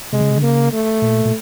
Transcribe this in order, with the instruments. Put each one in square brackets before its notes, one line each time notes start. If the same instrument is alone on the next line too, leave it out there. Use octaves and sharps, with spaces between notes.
[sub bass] C3 [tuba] G#3
[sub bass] C#3
C3
D3
[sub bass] C#3 [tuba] A#3
[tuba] A3
[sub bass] A#2
A#2